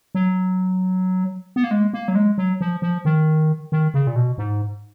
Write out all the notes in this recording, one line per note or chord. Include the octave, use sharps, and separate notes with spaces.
F#3
B3
A#3
G#3
A#3
F#3
G#3
F#3
F3
F3
D#3
D#3
C#3
A#2
B2
G#2